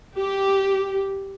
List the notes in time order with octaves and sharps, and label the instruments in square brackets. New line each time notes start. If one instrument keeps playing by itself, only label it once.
[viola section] G4